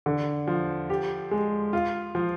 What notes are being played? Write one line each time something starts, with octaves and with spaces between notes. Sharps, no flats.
D3
F3
G4
G#3
F4
F3